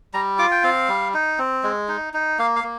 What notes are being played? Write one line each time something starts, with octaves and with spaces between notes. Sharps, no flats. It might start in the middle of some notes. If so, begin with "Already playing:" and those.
G3 A#5
F4 D6
G5
C4 F5
G3
D#4
C4
G#3
D#4
D#4
A#3 F5
F5
A#3